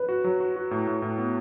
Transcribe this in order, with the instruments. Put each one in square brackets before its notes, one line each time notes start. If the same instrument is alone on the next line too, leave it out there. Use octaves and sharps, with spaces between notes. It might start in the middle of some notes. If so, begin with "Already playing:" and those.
Already playing: [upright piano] B4
[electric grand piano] F#4
F#3
F#4
F#4
A2
A2
A2
B3